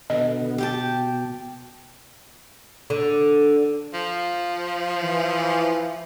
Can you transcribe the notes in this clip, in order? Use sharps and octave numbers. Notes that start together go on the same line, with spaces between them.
B2 D3 B3 D#5
B2 G4 G5 A5
D3
F3
E3